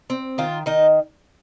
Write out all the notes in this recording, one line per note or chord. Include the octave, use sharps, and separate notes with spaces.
C4
D#3 F4
D#3 D#4